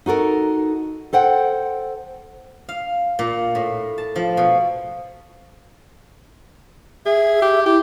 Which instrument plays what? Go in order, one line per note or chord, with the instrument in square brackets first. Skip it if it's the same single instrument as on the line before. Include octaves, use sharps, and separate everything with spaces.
[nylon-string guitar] D#4 F#4 A4 A#4
A4 C5 F#5 G5
[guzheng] F5
A#2
A2
A5
F3
B2
[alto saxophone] G#4 [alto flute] E5
[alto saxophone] G4
[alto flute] E4 [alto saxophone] G4